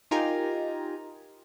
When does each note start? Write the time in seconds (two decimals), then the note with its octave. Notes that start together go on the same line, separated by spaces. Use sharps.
0.11 D#4 F4 G4 A#4 G#5 A#5